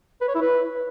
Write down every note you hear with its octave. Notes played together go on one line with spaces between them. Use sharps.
B4
C#5
E4
B4